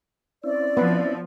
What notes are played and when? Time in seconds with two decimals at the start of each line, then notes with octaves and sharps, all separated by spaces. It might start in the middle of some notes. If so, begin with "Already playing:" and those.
0.44 C4 C#4 E4 D5
0.77 F3 B3 B4